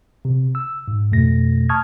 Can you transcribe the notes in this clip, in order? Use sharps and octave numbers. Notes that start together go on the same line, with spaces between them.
C3
E6
G#2
F2 B2 A3 A#6
A5 C#6 D#6 F6 G#6